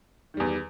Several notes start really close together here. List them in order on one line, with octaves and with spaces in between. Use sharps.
D#3 G3 E2